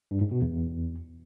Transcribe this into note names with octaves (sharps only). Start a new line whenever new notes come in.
G2
G#2
B2
E2